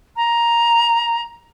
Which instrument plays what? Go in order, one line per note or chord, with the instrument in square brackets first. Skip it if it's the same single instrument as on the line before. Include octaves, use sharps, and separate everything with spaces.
[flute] A#5